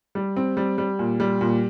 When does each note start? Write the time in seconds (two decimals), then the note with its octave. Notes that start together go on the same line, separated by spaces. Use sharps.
0.15 G3
0.36 C4
0.57 G3
0.78 G3
0.99 A#2
1.20 G3
1.41 A#2